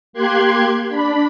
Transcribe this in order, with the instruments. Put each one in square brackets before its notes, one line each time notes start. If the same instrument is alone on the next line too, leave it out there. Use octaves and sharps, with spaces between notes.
[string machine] A#3 G4 C6 F#6 G#6
D4 B5